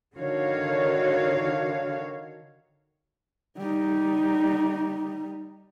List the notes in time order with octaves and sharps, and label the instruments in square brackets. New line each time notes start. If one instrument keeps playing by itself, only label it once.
[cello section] D3 D#3 F#4 C#5 F5
[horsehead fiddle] G3 D#4